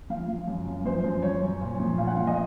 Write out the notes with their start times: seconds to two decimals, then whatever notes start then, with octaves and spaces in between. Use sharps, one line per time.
0.10 F3 F5
0.28 F3
0.47 F#2
0.66 F#2
0.85 F3 C5
1.04 F#2
1.22 F#2 C#5
1.41 F#2
1.61 A#2
1.80 F3
1.98 A#2 F5
2.07 F#5
2.17 F3 F5
2.27 D#5